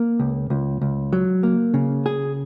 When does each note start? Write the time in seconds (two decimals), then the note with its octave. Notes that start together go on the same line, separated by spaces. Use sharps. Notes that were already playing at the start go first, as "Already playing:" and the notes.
Already playing: A#3
0.19 C#2
0.50 C#2
0.81 C#2
1.13 F#3
1.43 A#3
1.74 C#3
2.06 G#4